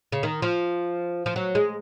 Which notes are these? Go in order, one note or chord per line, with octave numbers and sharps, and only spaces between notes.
C#3
D#3
F3
F3
F#3
G#3